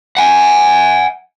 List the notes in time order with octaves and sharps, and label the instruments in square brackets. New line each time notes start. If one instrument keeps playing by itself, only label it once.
[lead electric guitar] F#5 G#5